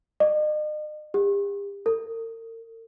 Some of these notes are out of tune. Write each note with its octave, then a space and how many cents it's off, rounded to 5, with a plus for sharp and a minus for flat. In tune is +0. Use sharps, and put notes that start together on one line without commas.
D#5 -40
G4 +45
A#4 -40